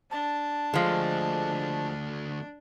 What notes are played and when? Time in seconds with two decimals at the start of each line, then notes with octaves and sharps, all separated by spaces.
0.11 D4 A5
0.74 D3 F3 G#3 A3